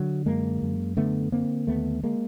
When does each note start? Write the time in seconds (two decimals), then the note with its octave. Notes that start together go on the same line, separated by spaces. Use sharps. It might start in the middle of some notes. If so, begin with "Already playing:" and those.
Already playing: D3 F#3
0.26 F#2 G#3 A#3
0.62 F#2
0.97 D3 A3 B3
1.32 D3 A#3 C4
1.67 D#2 A3 B3
2.03 G#3 A#3